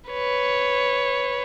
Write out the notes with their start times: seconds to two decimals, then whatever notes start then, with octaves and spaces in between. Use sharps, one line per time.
0.10 B4 C#5